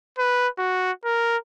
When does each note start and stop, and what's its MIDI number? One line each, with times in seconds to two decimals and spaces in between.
0.18 0.48 71
0.58 0.92 66
1.05 1.37 70